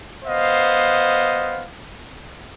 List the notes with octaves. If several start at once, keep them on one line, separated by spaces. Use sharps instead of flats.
B3 C5 D#5 F5